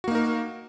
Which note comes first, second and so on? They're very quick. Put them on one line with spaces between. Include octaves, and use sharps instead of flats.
F#4 A#3 D#4 A#4